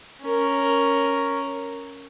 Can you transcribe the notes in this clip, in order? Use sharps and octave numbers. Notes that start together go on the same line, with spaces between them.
C#4 A#4